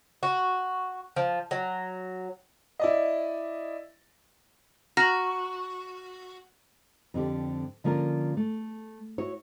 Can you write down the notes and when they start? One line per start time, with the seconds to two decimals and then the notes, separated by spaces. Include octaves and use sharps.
0.23 F#4
1.16 F3
1.51 F#3
2.79 E4 D5 D#5
4.97 F#4 A#5 F6 A#6
7.14 F2 D3 G4
7.84 D3 F3 A#3 C#4 F4 A#4
8.37 A3
9.18 E4 F#4 C#5